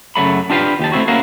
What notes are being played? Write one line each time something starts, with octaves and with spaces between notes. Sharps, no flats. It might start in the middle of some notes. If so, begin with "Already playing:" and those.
F#2 C#3 F#3 A3 B5
D4 F4 G4 B4 F5
D#2 G4 A5
A3 C4 E4 F#4
A#3 C#4 E4 F#4 A#4 F5